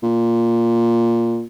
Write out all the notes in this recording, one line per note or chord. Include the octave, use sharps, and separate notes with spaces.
A#2